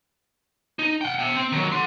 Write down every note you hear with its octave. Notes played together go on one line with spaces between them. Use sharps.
D#4
F#5 G5
E5 G5
C4
D#3 F#3
F#5 C6